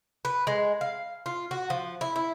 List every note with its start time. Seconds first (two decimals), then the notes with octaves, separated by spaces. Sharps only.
0.25 B4
0.47 G#3
0.81 F5
1.26 F4
1.51 F#4
1.70 F3
2.01 E4
2.16 E4